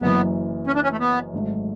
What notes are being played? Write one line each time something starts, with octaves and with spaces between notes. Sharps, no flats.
F#1 F#2 E3 B3
C#4
D4
C#4
A3
B3
G#1 G#2 F#3 A3